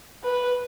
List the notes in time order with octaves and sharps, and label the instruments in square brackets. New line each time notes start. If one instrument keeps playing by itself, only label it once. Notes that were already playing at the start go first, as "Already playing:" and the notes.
[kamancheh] B4